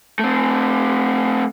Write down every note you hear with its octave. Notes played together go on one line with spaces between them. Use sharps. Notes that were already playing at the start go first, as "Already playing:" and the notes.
A3 C4